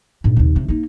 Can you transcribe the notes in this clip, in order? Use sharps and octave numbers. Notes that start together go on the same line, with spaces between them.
A#1 G#2
D#2 C3
C3
A#3 D#4